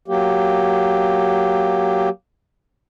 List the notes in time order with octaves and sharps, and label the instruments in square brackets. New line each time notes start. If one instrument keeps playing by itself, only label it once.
[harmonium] F#3 A#3 G4